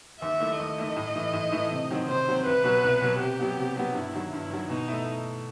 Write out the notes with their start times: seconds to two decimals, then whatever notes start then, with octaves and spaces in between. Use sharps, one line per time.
0.22 D#2 E5
0.40 D#3 A3 E4
0.59 D#2 D#5
0.78 D#3 A3 E4
0.97 A2
1.15 E3 A3 E4
1.33 A2
1.52 E3 A3 E4
1.71 C3
1.90 D#3 F#3 C4
2.08 C3 C5
2.27 D#3 F#3 C4
2.46 C2 B4
2.64 B2 F#3
2.84 C2
3.01 B2 F#3
3.20 C3 G4
3.40 F#3 B3
3.57 C3
3.76 F#3 B3
3.95 G2 E4
4.13 D#3 F#3
4.32 G2 E4
4.50 D#3 F#3
4.70 B2 D#4
4.88 A3 E4